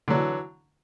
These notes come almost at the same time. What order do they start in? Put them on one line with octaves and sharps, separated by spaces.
D3 F#3 E3